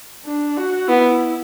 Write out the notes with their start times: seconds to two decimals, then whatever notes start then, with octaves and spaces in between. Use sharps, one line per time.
0.25 D4
0.57 F#4
0.88 B3 E4